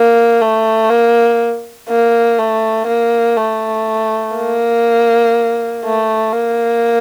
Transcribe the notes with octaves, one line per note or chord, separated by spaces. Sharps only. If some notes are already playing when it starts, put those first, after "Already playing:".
Already playing: A#3
A3
A#3
A#3
A3
A#3
A3
A#3
A3
A#3